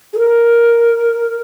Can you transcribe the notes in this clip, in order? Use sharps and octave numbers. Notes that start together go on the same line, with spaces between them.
G#4
A#4